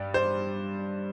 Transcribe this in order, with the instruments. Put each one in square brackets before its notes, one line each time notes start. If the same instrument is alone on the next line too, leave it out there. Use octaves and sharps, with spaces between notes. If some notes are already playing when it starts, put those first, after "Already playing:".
Already playing: [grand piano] G2 G3 D5
C5